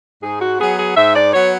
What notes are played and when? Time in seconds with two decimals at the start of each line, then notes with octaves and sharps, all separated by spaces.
0.22 G#2 G#4
0.41 F#4
0.60 F#3 B3 G#4
0.79 G#4
0.96 G#2 E5
1.15 D5
1.33 F#3 B3 C#5